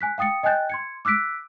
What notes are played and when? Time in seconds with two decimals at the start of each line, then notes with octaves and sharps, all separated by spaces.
0.01 G#5 F#6 B6
0.18 F5 G5 D#6 A6 C#7
0.43 D#5 G5 G#5 F#6 G6 A6
0.70 C6 G#6 C#7
1.05 D6 E6 F#6 B6 D7